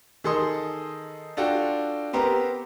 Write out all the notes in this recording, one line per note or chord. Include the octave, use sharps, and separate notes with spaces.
D#3 G#4 A4 D#5 C6 D#6
D4 F4 F#4 A4 G5
B3 C4 G4 A#4